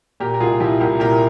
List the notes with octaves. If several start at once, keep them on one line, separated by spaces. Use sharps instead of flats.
A#2 G4 A#4
A#4
C2 F4 G#4
F3 E4 G4
C2 G4 A#4
A#2 G4 A#4